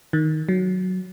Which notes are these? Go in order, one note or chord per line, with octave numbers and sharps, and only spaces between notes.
D#3
F#3